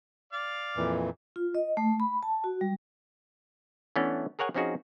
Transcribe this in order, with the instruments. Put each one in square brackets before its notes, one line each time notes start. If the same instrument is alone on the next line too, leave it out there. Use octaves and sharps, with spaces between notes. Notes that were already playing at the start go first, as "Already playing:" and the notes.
[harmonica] D5 F5
[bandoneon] F2 A#2 E3
[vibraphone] F4
D#5
A3
B5
A5
F#4
G3
[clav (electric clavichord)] E3 A3 B3 C#4 D4
G#4 A#4 C#5 F#5 G#5
F3 C4 C#4 D#4 F#4 G#4